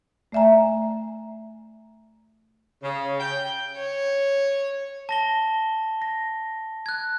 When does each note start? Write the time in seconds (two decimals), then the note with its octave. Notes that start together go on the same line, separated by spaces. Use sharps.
0.32 A3 D5 E5 G#5 A#5
2.83 C#3
3.20 G5
3.78 C#5
5.09 A5 A#6 G7
6.02 A#6
6.86 F#6 G#6